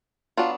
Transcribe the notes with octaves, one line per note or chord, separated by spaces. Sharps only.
F#3 B3 D4 F4